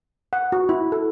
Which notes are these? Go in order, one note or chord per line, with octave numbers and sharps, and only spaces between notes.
F#5
F#4
E4
A4